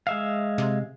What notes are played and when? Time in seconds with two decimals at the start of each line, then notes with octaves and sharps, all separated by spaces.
0.07 G#3 E5 F5
0.58 C3